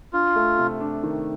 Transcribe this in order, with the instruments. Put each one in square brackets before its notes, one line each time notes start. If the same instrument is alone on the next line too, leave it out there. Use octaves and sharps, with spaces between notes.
[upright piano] D4 [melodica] F4
[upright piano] A3
C3
D4
D#3